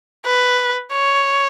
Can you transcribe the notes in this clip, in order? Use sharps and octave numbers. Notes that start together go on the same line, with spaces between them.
B4
C#5